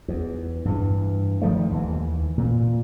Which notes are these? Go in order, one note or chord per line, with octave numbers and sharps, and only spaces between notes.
E2
G2 E3
D#3 F3 G3 A3
D#2 E3
A#2